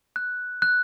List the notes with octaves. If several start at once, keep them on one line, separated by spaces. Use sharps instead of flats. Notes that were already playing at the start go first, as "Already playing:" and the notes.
F#6
F#6